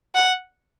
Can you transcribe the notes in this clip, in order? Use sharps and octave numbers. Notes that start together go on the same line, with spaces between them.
F#5